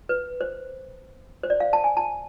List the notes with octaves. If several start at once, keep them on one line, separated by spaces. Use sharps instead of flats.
B4
C5
C5
D5
F5
A5
G#5
A5